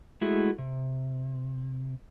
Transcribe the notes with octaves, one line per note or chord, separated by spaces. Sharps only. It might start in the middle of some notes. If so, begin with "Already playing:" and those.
G#3 A3 E4 F#4 G#4 A4
C3